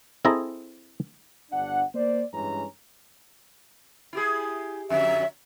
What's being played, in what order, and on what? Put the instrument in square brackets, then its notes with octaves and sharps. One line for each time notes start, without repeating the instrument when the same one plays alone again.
[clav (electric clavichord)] C4 E4 G#4 A4 D#5 A#5
[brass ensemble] G1 D4 F#5
A#3 C5 D5
G2 E3 G#3 C#4 A#5
[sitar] E4 G4 G#4
[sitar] F2 D3 F#3 [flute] E5